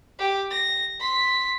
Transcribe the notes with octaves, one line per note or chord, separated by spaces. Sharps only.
G4
A#6
C6 B6